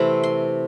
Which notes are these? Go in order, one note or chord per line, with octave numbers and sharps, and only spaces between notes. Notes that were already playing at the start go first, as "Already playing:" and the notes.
Already playing: C3 E3 A3 C4 B5
C6